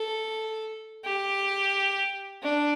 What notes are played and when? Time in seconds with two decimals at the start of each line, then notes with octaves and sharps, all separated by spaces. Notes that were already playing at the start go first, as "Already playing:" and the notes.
Already playing: A4
1.05 G4
2.43 D4